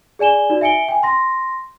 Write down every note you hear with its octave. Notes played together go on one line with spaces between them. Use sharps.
G#4 D5 G#5 E7 G7
D#4 F#4 D5
E5 G#5 C#7 D7 G7
G5 G#5
C6 A#6